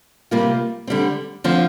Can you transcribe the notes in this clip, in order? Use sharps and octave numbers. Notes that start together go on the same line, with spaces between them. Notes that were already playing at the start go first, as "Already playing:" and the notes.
C3 G3 A#3 F4
D3 G3 C4
D3 F3 C4